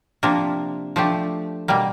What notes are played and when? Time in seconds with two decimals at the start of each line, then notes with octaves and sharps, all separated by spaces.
0.23 C3 F3 A#3 D4
0.96 F3 A3 D4 G4
1.68 B2 G3 A#3